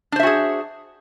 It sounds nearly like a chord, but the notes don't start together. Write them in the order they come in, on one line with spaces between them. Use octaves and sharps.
D4 C5 E5 F#4 G#4